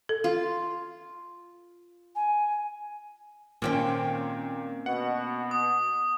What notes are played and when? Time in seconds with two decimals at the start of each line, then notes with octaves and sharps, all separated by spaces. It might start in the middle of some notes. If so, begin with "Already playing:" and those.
0.09 A4
0.24 F4
2.15 G#5
3.62 A#2 D#3 A#3 C4 C#4
4.86 B2 F#5
5.51 D#6